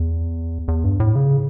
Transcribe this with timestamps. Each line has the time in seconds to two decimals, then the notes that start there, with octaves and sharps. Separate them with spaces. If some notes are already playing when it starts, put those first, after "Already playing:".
Already playing: E2
0.68 E2
0.84 G2
1.00 A2
1.16 C#3